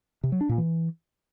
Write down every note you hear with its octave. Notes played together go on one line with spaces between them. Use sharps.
C3
F#3
D4
A#2
E3